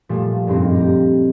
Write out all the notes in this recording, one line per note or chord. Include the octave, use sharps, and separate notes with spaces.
A#2 F3 G3 A3
F#1 G2 A#3 C4 D#4
G4 A#5